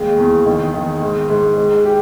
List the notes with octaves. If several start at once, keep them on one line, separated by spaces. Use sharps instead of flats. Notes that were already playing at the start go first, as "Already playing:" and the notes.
Already playing: D#2 G#3
E2
D#3
D#3
G#2
G#2
G#3
G4